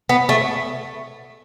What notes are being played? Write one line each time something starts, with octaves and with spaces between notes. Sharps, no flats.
B3
A3